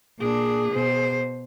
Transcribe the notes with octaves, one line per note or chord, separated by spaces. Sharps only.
A#2 D4 G#4
B2 C5